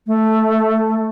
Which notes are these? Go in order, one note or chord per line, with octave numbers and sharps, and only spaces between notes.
A3